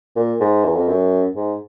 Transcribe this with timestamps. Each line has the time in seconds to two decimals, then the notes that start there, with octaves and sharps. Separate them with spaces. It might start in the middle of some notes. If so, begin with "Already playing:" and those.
0.16 A#2
0.40 G#2
0.64 E2
0.76 F2
0.88 F#2
1.36 G#2